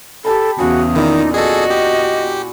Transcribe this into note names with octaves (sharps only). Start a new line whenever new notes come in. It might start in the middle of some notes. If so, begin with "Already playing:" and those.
G4 A4 A5 B5
E2 C#3 F#4 G#4
A#2 D#3 D#4 E4 D5
F#4 G#4 A4 D#5
G4